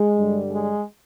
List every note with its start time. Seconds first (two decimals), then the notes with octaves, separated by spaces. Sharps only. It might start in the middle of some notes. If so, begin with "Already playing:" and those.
Already playing: G#3
0.17 G2 D3 G3
0.51 G#3